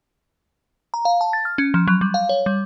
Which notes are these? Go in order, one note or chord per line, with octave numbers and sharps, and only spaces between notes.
A#5
F5
A5
A6
F6
C#4
F3
F#3
G3
F5
C#5
G3